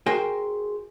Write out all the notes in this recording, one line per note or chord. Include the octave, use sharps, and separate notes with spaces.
F#4 G#4 A#4 C5 G5 G#5